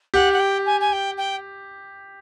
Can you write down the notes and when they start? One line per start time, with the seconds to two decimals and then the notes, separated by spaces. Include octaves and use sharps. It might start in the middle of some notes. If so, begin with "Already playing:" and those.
0.14 G4 F#5
0.33 F#5
0.39 G5
0.66 G#5
0.80 G#5
0.92 G5
1.17 G5